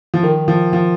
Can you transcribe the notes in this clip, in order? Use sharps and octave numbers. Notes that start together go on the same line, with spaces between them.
F3
D#3
F3
F3